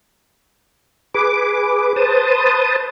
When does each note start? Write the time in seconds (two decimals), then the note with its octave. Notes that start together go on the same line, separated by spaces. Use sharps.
1.14 G#4 B4 D6
1.96 B4 C5 A5 D#6